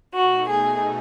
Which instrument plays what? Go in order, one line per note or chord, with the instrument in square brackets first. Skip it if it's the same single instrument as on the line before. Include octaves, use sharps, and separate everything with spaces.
[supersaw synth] B2 A3 D#4 [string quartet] F#4
[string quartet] G#4